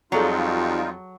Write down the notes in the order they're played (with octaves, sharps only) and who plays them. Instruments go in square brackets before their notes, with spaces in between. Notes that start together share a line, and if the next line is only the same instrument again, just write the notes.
[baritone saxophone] F2 [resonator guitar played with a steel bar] F#3 [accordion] G3 D#4 F4 [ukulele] G#4 A4 A#5